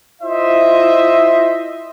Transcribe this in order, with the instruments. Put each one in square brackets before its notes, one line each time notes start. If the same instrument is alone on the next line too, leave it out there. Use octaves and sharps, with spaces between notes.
[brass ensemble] E4 F4 C5 D#5 E5